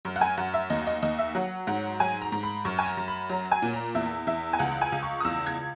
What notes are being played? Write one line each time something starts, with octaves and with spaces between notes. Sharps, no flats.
F#2
F#5
G#5
F#2 F#5
E5
D#2 D#5
D#5
D#2 D#5
E5
F#3 F#5
G#2 F#5
F#3 G#5
A#5
G#2
B5
F#2 C#6
G#5
A#5
F#2
B5
F#3 A#5
G#5
A#2
A#5
E2 E5
E2 E5
G#5
C#2 F#5
G#5
C#2
C#6
D#6
E2 E6
G#6